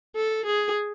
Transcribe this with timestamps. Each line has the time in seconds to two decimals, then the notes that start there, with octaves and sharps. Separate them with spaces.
0.16 A4
0.46 G#4